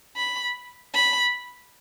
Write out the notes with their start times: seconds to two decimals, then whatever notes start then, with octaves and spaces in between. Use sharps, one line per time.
0.16 B5
0.94 B5